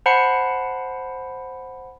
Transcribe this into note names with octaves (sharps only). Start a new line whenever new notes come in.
C5 F#5 A5 B5 C7 C#7